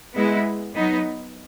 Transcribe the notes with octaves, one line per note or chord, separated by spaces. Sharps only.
G#3 B3 E4
F#3 B3 D#4